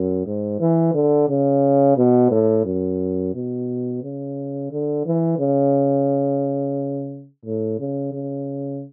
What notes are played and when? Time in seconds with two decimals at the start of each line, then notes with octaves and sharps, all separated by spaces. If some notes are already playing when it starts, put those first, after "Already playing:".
Already playing: F#2
0.26 G#2
0.60 E3
0.94 D3
1.28 C#3
1.97 B2
2.31 A2
2.65 F#2
3.35 B2
4.03 C#3
4.71 D3
5.06 E3
5.39 C#3
7.45 A2
7.79 C#3
8.13 C#3